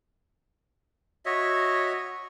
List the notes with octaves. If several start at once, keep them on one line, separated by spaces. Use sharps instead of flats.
F#4 C#5 D#5 E5